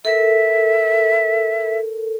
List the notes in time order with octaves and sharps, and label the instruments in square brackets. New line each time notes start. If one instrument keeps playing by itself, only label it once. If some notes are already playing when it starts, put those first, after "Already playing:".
[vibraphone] A4 A#4 [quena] E5